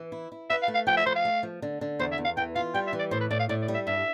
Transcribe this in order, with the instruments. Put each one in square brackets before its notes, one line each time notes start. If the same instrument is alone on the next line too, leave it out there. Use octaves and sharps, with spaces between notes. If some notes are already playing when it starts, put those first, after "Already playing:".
Already playing: [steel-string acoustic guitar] E3
E4
E4
[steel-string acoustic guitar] B4 [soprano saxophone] E5
[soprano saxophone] F5
[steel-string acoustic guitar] A3
[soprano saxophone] F5
[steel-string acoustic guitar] F3 [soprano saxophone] G5
[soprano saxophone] E5
[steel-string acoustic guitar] F3 [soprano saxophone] C5
[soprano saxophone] F5
[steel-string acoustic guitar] A3
F3
D3
D3
[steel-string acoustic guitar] E2 [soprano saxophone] C5
[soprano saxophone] E5
[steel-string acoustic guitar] E2
[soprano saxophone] F5
[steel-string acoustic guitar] E3 [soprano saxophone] G5
[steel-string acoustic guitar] F4 [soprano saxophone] F5
[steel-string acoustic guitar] G3 [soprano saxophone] G5
[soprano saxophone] E5
[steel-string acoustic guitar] E3
[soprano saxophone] D5
[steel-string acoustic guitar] A2 [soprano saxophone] C5
[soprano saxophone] B4
[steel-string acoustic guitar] A2 [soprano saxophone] D5
[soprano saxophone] F5
[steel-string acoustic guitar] A2 [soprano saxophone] D5
[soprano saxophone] D5
[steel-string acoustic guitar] G3
[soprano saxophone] E5
[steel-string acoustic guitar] G2 [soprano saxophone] E5